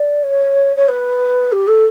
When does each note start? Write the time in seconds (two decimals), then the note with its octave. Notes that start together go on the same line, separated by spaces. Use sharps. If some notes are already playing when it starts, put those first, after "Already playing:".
Already playing: D5
0.23 C#5
0.76 C#5
0.88 B4
1.52 G4
1.67 A4